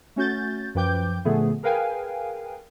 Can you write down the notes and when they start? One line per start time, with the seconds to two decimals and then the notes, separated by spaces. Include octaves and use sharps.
0.16 A3 C#4 F#4 G6 A6
0.75 F#2 F3 B4 G5 D6 G6
1.25 A#2 D3 F3 A3 B3 G#4
1.63 G#4 A#4 B4 F5 G5 G#5